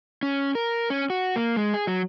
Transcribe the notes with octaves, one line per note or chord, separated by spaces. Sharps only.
C#4
A#4
C#4
F#4
A#3
G#3
G#4
F#3